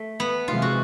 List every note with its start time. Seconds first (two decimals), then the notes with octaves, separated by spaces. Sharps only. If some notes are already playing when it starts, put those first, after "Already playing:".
Already playing: A3
0.20 B3
0.48 C3 E3 G#3 F4
0.62 F#4